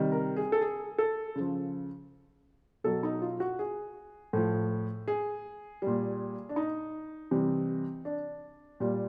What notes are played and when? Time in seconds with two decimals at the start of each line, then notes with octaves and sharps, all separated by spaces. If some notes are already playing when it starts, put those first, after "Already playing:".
Already playing: C3 D#3 G3
0.12 A#4
0.37 G#4
0.52 A4
0.61 G#4
0.98 A4
1.36 C#3 F3
2.84 B2 F#3 A4
3.03 D#4
3.22 F4
3.40 F#4
3.59 G#4
4.33 A2 F3
5.08 G#4
5.82 A#2 G3
6.49 D4
6.56 D#4
7.31 C3 E3 G3
8.05 D4
8.80 A#2 G3